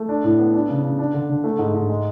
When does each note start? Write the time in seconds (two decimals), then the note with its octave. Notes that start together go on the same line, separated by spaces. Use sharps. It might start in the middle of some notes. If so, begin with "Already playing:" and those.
Already playing: A3
0.09 D4
0.24 A2
0.39 B3
0.54 D4
0.69 C#3
0.84 C#3
0.99 D4
1.14 D3
1.29 D3
1.44 A3
1.59 G#2
1.74 G#2
1.90 G#3